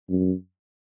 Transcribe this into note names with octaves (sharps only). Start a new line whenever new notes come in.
F#2